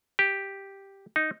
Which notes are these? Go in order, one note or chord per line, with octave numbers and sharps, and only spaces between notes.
G4
D#4